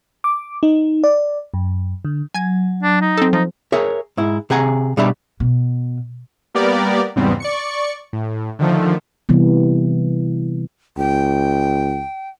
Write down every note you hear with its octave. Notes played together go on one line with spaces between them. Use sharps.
D6
D#4
D5
F#2
D3
F#3 G#5 G#6
D4
D#4
C4 A4
F3 D#4
G#4 A#4 C#5 E5
G#2 E4
C3 G#4 F#5 G#5 A#5
B2 G3 D4 G4 E5 B5
B2
G3 A#3 B3 G4 A#4 D5
E2 G#2 C#3 G3 B3 C4
D5 C#6 C#7
A2
D3 D#3 F3 A3
C3 E3 G3 B3
C#2 G5